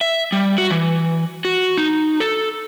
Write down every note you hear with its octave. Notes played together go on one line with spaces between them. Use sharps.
E5
G3
F#4
E3
F#4
D#4
A4